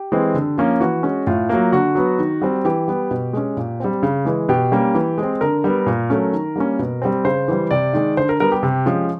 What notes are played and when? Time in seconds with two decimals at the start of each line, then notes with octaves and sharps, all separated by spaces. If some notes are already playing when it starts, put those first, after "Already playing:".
Already playing: G4
0.12 E3 G#3 C4
0.34 D3
0.58 F3 A#3 C#4
0.80 E3 F#4
1.03 G#3 C#4
1.27 A2 F4
1.49 F#3 A#3
1.72 D3 F#4
1.95 F#3 B3
2.19 D#3
2.42 G3 C4
2.65 E3 G4
2.88 G3 B3
3.11 B2
3.33 G#3 C#4
3.57 A#2
3.80 G3 C4
4.03 C#3
4.25 E3 G#3
4.49 B2 G4
4.72 G3 A#3 C#4
4.95 E3
5.18 G#3 C4
5.41 D3 A#4
5.64 G3 B3
5.86 A#2
6.10 F#3 A3 C#4
6.33 D#3
6.56 G3 A#3 C#4
6.79 B2
7.02 G3 C4
7.25 C#3 C5
7.48 E3 G3
7.71 C3 D5
7.93 D#3 G#3
8.17 D3 C5
8.29 A#4
8.40 G3 B3 A#4
8.52 G4
8.63 C3
8.86 F3 G#3 C#4